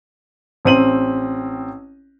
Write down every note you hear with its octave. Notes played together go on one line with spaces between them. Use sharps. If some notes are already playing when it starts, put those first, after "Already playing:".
A1 C4 D#7 F#7